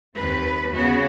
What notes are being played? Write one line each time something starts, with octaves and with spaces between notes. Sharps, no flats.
D#2 C4 B4
C#3 B3 F#4